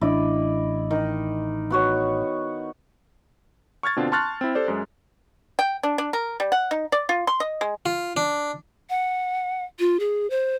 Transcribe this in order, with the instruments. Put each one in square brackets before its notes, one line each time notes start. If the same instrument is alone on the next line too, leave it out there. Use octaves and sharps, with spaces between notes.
[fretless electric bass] A1 D4 [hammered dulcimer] E4 D5 D#5
[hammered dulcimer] D#3
B3 F#4 C#5
[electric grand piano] C#6 F6 G#6 A6
B2 D3 C4 D4 F4
A5 C6 C#6 F6 F#6 A6
C4 E4
G4 A4 C5 D5
F#2 G#3
[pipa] G5
D4
D4
A#4
G3
F#5
D#4
D5
F4
C6
D#5
G#3
[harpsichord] F4
D4
[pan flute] F#5
F4
G#4
C5